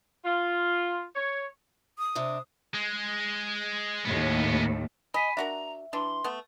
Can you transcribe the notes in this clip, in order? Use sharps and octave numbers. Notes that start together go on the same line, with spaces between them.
F4
C#5
D#6
C3 D4
G#3
D#2 A2 G#3 B3
D#5 G#5 B5 B6
D4 F#4 A#4 E5 A#5
E3 D4 C6
A3 B3